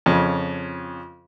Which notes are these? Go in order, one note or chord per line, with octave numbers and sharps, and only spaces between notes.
F2 C#3 C#4